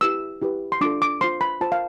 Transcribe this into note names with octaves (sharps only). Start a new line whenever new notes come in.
E4 G4 B4 E6
E4 G4 B4
C6
D4 F4 A4 D6
D6
F4 C5 C6
B5
F4 C5 A5
F5